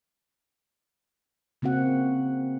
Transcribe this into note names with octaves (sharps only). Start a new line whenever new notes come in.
C#3 A#3 C4 F#4 F#5